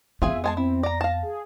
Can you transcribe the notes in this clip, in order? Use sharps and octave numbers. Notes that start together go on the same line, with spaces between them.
F2 B3 F4 G#4 E5 G#5
G#3 G#5 A5 C6
C4 E4
D5 A#5 A#6
F5 A5
G#4